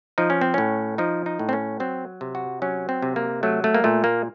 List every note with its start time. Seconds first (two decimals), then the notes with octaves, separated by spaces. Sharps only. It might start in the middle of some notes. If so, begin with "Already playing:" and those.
0.18 F3 D#4
0.30 C#4
0.41 C4
0.54 A2 C#4
0.98 F3 D#4
1.26 D#4
1.39 A2
1.49 C4
1.53 C#4
1.80 F#3 C4
2.21 C3
2.35 F#4
2.62 F#3 C#4
2.89 C4
3.02 C3
3.16 A#3
3.43 F#3 A3
3.64 A3
3.74 A#3
3.84 A#2 A3
4.04 A#3